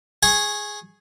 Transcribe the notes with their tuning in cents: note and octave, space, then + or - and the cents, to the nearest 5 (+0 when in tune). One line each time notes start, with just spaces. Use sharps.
G#4 +0 G#5 +0 C#6 -20